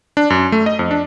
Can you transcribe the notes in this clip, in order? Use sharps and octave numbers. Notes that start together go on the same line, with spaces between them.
D4
F#2
A3
D#5
F2
D4